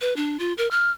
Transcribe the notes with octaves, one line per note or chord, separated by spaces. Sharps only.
B4
D4
F4
A#4
F6